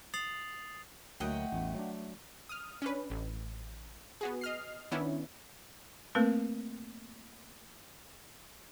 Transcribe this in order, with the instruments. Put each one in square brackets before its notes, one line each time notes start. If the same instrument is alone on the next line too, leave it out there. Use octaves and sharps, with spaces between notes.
[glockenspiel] D#6 A6 C7 F7 F#7
[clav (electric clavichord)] D2 F#3 A#3 [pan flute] A3 [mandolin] D#5 F#5 G5
[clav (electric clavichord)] A1 E2
F#3 D4
[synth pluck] D#6 F6
C#4 D4 B4
A1
B3 F#4 G#4
D#5 F6 C7
D#3 B3 C#4 D4 E4
[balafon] A3 A#3 C4 A#4 B4